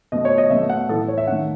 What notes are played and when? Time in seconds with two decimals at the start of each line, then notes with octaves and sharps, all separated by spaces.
0.12 B2 A3 D#5
0.25 C#5
0.38 D#5
0.50 B2 E5
0.53 A3
0.69 F#5
0.89 A2 E3 A3 A4
1.08 C#5
1.18 E5
1.27 D#3 A3 F#5